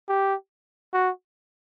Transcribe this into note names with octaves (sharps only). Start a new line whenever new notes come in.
G4
F#4